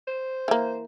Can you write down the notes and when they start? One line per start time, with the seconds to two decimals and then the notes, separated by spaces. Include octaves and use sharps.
0.07 C5
0.48 E3 A#3